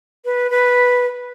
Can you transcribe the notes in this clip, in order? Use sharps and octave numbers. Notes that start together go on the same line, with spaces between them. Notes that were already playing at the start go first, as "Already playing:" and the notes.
B4
B4